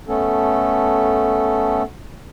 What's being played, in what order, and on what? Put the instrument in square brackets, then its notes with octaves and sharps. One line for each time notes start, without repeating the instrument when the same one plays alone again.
[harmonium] A3 B3 C#4 A4